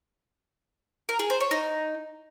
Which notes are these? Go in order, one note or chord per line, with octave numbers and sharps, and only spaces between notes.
A#4
G#4
C5
C#5
D#4